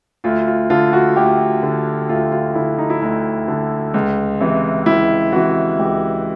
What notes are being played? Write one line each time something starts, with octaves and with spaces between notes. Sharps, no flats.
D2 F4
F4
D3 F4
F#4
D2 G4
D3
D2 F4
F4
D3 E4
D#4
E4
D2 D#4
D3
C#2
C3 E3
C#2 E4
C3 E3 F#4
C#2 G4